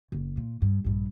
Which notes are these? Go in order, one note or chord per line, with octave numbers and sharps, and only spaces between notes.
F#1
A#2
G2
A#1 G2